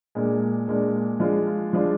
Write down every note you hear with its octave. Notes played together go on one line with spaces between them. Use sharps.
A#2 G#3 D4
A#2 G#3 D4
F3 G#3 D4 F4
F3 G#3 D4 F4